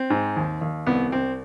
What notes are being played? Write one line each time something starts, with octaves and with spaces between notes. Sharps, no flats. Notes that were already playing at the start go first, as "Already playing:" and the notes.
Already playing: C4
G#2
D#2
D#2
C2 B3
C2 C4